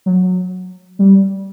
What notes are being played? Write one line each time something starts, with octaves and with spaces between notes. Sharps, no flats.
F#3
G3